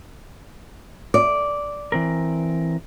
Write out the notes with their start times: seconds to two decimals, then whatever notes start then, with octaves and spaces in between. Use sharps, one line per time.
1.14 D5
1.92 E3 C4 A#4